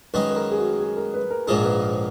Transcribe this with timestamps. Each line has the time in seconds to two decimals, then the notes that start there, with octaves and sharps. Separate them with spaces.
0.14 F#2 D#3 G#3 D#4 B4
0.31 B4
0.36 A#4
0.51 G#4
0.58 F#4
0.80 G#4
0.97 A#4
1.14 B4
1.31 A#4
1.47 A#1 G#2 F3 G#3 D#4 A#4
1.65 B4